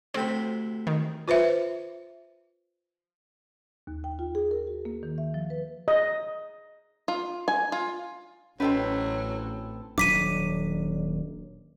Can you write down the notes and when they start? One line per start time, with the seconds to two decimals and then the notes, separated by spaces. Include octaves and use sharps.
0.14 D2 C3 C4 B5
0.87 D#3
1.28 F4 B4 C5 E5
3.87 D#2
4.04 G5
4.19 F4
4.35 G#4
4.51 A#4
4.67 F#4
4.85 A#3
5.03 D#3
5.18 E5
5.34 F3
5.50 B4
5.88 D#5
7.08 F4
7.48 G#5
7.72 F4
8.60 A1 F#3 C4 C#4 A4 B4 D#5 G5
9.98 D#1 F#3 D4 D6 B6 D#7